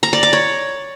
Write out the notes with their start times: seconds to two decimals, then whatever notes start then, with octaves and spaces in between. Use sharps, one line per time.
0.03 A#5
0.13 D5
0.23 D6
0.33 C#5